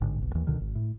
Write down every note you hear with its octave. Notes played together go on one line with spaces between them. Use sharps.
A1 G#2 D3
F1 B1
D#2 E3
C#2 B2 D3 D#3
G#1
A2